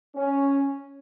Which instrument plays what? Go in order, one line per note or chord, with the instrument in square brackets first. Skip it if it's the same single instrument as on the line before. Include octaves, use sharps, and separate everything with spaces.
[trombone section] C#4